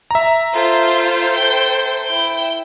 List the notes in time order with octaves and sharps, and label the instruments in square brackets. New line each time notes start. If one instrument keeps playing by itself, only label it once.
[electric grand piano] E5 A#5
[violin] F4 [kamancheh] A4 C5
[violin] G5
E4 G5